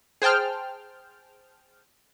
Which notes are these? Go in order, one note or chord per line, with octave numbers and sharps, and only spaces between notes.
G#4 C5 G5 A5 F6